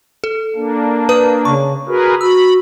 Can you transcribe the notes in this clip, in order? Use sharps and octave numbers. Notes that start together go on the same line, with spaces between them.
A4
A#3 D4
B4 D#6
C#3 C#6
F#4 G#4 A#4 B4
F#4 B5 E6